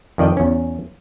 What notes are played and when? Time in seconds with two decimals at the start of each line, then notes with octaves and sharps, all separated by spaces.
0.18 F2 D#3 D5 D#5 G5
0.37 E2 C#4